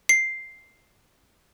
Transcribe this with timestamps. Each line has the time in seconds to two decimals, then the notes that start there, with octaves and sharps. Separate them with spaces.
0.09 C7